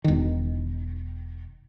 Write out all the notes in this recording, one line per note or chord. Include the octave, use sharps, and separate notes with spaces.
E1 D#3